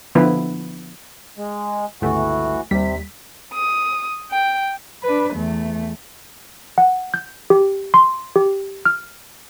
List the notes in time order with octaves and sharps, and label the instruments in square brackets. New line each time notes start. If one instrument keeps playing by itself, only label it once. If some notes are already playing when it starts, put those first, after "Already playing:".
[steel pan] D3 F3 B3 E4 B4
[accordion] G#3
[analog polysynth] G1 C#2 A3 [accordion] E3 F#4
[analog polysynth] D#2 G3 B6 [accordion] C3
[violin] D#6
G5
[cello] D4 B4
E2 A3
[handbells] F#5
G6
G4
C6
G4
F6